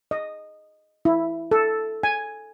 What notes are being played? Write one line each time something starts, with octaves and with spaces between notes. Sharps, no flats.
D#5
E4
A4
G#5